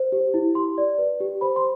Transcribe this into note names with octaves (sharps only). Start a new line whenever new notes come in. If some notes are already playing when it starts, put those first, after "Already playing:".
Already playing: C5
G4
E4
G4 C6
D5
B4
G4
C5 B5
C6